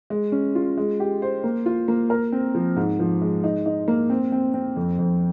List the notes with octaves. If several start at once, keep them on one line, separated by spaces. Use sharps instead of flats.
G#3
C#4
F4
G#3
G4
C5
A#3
F4
A#3
A#4
C4
F3
G#2
F3
G#3
D#4
D#4
A#3
C4
C4
C4
F2
F2